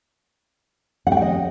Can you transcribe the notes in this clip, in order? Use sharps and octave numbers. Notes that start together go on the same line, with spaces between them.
F#5
G5
F#5
D#5